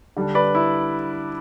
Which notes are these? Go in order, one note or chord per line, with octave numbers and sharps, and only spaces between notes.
D3 G3 D4
B4 D5
E4